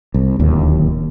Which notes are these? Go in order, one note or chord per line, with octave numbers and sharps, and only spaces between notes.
C2
D1 D#2